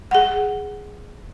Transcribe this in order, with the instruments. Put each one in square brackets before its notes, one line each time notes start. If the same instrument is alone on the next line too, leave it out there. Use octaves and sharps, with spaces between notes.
[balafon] G#4 F#5